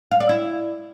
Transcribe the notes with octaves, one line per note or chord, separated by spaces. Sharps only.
F5
D5
E4